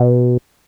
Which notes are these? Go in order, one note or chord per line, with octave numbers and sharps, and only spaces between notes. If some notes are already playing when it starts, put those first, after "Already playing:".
Already playing: B2